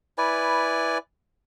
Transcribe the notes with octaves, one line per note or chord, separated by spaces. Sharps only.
E4 B4 D5 G#5